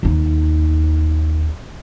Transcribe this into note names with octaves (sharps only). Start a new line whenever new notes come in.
D#2 D#4